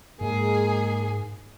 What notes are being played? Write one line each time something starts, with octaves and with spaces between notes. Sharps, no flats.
G#2 G#3 A#3 G#4